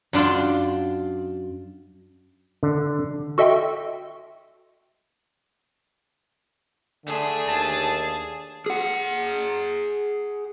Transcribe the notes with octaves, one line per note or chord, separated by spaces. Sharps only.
F#2 D4 F4 C6
D3
F#4 A4 D#5 E5 G5 C6
D3 A3 D4 G#4
D#2 A5
G#4 F#5